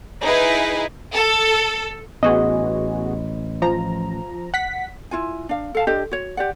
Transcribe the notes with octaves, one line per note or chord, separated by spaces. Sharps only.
D#4 E4 G#4 B4
A4
A1 B3 F#4 G#4 D#5
F3 A#5
F#5 B6
E4 F4 G#5
D4 F5
A4 F5 A5
D4 G4 A4 D#5
F#4 C#5
G4 D5 F#5